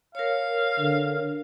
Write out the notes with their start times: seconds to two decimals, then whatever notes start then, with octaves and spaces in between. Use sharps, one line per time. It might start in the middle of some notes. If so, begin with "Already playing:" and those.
0.15 A#4 C#5 F5
0.79 D3